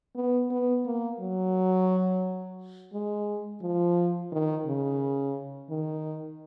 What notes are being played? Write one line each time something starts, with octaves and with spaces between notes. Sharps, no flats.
B3
B3
A#3
F#3
G#3
F3
D#3
C#3
D#3